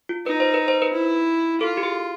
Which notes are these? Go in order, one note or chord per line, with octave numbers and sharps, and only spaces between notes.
F4
D#4 B4
C5
B4
C5
B4
E4
F4 A4
G4
G#4